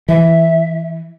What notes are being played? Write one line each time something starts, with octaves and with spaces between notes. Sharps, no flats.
E3 E5